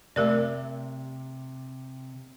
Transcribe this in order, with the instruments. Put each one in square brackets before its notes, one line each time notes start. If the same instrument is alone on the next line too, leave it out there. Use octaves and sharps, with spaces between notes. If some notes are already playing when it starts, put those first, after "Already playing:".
[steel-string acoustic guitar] C3 [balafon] A3 A#4 D5